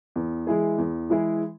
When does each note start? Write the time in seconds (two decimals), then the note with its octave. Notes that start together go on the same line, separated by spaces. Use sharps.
0.16 E2
0.47 E3 G#3 E4 G#4
0.78 E2
1.10 E3 G#3 E4 G#4